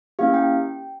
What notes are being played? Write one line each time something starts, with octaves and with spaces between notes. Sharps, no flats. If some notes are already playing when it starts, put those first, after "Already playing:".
A#3 C#4 E4 G4 F5
G5